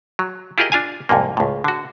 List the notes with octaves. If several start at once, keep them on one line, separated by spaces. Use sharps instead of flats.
F#3
E4 F4 G4 G#4 A#4 D#5
D4 F4 F5 G#5
C2 F2 G#2 A#3
C#2 A2
D3 F#4